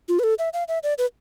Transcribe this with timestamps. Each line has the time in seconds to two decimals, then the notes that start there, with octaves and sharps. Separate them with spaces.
0.09 F4
0.19 B4
0.24 A4
0.39 E5
0.53 F5
0.68 E5
0.83 D5
0.98 B4